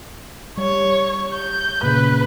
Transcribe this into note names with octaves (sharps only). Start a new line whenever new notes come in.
G3 C#5
G6
A#2 C#3 B4